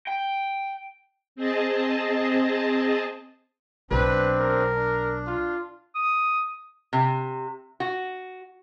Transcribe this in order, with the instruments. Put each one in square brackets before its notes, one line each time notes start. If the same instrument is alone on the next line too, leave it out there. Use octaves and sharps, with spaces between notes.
[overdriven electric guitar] G5
[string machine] C4 G#4 D#5 A5
[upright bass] B1 [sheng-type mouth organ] C4 D4 [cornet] B4
[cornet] A#4
[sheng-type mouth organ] D4
[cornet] F4
[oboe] D#6
[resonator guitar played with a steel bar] C3
F#4